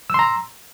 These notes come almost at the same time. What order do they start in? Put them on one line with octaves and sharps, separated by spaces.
E6 C6 A#5